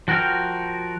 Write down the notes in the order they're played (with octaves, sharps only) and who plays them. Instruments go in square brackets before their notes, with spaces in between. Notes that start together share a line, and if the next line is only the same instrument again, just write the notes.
[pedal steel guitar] F3 F#4 A#4 G5 F6